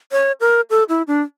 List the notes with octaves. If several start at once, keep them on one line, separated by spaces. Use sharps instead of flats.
C#5
A#4
A4
E4
D4